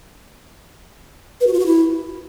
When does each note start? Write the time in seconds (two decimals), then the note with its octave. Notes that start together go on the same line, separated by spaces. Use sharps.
1.41 B4
1.47 F#4
1.53 F4
1.60 F#4
1.66 E4